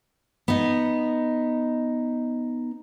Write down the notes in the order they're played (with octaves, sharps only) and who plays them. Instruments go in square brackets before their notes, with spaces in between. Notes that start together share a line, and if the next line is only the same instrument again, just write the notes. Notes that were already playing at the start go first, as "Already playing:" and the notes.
[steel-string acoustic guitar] B3 D#4